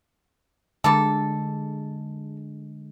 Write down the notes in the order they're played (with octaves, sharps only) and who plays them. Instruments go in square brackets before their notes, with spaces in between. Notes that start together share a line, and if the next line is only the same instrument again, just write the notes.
[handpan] D3 G#3 [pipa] G3 A#3 A4